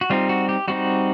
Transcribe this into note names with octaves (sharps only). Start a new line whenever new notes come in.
F#4
G3 C4 D#4 F4
F#4
G4
G3 C4 D#4 F#4